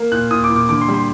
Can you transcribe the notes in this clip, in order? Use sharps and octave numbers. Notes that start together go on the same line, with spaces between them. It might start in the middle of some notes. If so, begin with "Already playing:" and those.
Already playing: A#3
A#2 F#6
A#2 D#6
D6
A#2
D6
D3 D6
C6
G3
C6